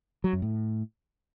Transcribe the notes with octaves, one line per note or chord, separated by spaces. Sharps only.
F#3
F#2
A2